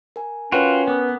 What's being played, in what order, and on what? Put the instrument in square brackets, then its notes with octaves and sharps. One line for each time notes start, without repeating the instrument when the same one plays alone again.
[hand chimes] A#4 G#5
[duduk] C#4 [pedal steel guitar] F4 F#4 [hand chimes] A#4 C#5 G5 [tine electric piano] B4 F#5
[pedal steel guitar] B3 [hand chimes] A#4 D6 D#6